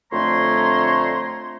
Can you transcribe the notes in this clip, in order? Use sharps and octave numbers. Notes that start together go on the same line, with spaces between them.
F2 D3 A3 C#5 A#5 C6